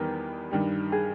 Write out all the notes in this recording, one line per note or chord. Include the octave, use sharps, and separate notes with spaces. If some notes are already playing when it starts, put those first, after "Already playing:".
Already playing: E2 D#3 G3 B3 G4 A#4
G2 D#3 G3
G#4